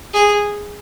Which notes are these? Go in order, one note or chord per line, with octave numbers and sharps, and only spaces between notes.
G#4